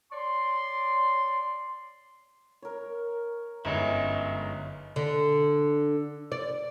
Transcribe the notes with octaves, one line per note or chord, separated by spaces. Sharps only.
C#5 D5 C6
A#4 C#5
G1 F#2 G#3 D#4 E4
D3
D5